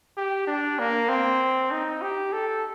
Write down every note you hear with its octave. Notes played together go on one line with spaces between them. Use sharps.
G4
D4
A#3
C4
D#4
G4
A4